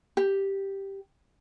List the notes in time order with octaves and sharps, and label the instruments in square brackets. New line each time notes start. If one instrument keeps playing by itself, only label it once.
[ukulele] G4